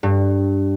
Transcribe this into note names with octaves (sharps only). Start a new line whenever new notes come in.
G2